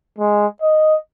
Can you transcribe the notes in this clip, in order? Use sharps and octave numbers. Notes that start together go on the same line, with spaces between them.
G#3
D#5